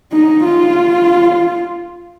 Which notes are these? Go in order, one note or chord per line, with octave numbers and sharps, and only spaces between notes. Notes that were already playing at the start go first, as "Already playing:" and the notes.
D#4
F4